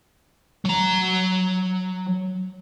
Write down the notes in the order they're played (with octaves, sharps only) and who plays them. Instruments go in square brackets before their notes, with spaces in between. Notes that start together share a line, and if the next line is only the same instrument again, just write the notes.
[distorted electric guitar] F#3 A#5